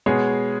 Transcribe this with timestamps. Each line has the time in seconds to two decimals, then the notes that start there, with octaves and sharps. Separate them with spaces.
0.06 B2 G#3 B3 G#4 C#5